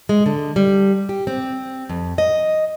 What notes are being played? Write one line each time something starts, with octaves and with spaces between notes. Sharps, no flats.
G#3
D3
G3
G4
C4
F2
D#5